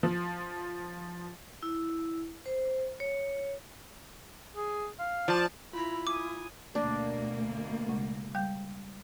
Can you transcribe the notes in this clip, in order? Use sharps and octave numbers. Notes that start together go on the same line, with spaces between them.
F3
E4
C5
C#5
G#4
F5
F3 D5 A5
E4 F4 A#5 B5
G#5 D6 D#6
D2 B2 A#3 D4
C#3 G#3
G3 G5 G6